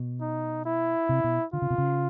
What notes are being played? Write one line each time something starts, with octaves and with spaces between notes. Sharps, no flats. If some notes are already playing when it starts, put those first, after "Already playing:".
Already playing: B2
D#4
E4
C3
B2
D3 F4
C#3
C3
C#3